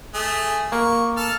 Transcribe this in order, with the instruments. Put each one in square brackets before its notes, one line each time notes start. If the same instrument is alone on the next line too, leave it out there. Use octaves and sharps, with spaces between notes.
[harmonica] A3 G#4
[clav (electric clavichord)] A#3 [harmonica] C#6
[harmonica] A4 A5 F6